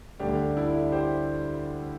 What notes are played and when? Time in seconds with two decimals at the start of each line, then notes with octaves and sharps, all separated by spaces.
0.20 D2 D3 G3 D4 G4
0.56 E4 A4
0.92 G4 C5